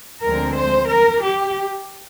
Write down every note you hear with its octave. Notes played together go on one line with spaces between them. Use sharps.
D2 D3 F3 G#3 C4 A#4
C5
A#4
G4